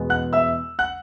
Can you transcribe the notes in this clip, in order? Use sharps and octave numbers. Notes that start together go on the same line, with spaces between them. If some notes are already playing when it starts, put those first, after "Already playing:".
Already playing: E2 B2 G#3 B3
F#5 F#6
E5 E6
F#5 F#6